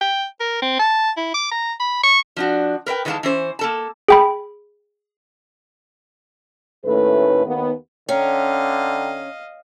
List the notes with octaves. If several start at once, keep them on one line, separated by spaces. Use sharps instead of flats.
G5
A#4
C4
A5
E4
D6
A#5
B5
C#6
F3 D4 F#4
A#4 B4 E5 G5
D#3 E3 G#3 B4 F5 A5
E3 C#4 C5
A#3 A4 A5
G#4 G5 B5
D#2 A2 A3 C#4 A4 B4
D#2 B3
D3 C#4 D#5 F5 G5 A#5